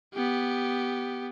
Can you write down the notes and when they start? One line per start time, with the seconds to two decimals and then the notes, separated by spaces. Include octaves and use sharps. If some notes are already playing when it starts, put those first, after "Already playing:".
0.14 B3 G4